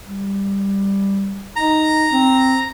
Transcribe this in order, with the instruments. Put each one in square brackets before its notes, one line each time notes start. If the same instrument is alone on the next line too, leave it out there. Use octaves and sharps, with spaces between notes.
[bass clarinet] G3
[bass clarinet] D#4 [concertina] A#5
[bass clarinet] C4